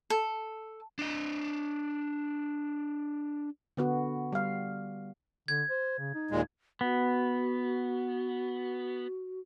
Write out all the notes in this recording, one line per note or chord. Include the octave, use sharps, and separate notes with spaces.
A4
D4 D#5
D3 B3 F#4
G3 F5
D3 G#6
C5
C#3
D#4
D#2 A#2 G#3
B3 F#4